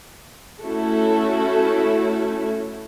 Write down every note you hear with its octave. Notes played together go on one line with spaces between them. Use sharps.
A3 C#4 E4 F#4 A4